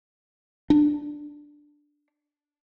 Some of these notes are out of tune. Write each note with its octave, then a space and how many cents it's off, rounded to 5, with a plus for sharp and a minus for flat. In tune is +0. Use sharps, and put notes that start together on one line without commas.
D4 +5